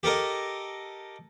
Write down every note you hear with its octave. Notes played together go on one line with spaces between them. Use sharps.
G4 A4 A#4 D#5